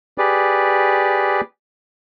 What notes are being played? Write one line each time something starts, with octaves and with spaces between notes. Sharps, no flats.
G4 G#4 B4 D5